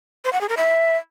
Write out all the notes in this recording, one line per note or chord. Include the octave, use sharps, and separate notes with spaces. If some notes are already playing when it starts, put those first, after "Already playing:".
C5
F#5
G#4
A#4
E5